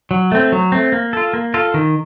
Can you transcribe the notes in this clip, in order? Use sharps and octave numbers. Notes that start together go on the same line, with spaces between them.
F#3
A3 C4
F#3
A3 C4
A#3
F4 A4
A#3
F4 A4
D#3